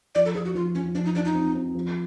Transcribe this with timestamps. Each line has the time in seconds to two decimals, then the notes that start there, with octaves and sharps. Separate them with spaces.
0.15 F3 D5
0.25 A4
0.35 F3 G#4
0.45 F#4
0.55 F3 F4
0.75 F3 C#4
0.95 F3 D4
1.05 D#4
1.15 F3 D4
1.25 D#4
1.35 C4
1.55 C4
1.75 F3